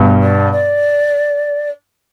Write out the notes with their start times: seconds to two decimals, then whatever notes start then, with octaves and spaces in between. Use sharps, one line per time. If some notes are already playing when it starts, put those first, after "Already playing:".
Already playing: G2 B2
0.22 D5
0.52 D5